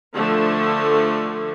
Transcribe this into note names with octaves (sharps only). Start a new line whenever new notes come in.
D3 F3 A3